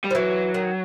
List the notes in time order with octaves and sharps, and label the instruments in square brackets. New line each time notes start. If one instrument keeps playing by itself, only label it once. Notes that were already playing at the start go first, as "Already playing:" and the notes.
[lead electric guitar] G3
[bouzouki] F3
[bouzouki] E3 [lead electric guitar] F#3
[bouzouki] D#3